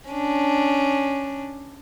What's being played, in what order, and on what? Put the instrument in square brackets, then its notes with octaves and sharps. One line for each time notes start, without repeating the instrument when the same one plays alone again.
[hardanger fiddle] C#4 D4